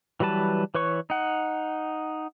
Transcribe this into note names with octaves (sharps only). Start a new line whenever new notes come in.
E3 F#3 G3 B4 A5
E3 B4 C#5 C#6
D#4 F#5